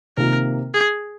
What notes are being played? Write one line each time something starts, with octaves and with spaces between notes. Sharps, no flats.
C3 D#3 A#3 F4 A#4
G#4